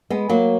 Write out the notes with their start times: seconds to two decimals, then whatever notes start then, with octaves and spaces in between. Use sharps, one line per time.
0.10 G#3 B3
0.29 F#3 A#3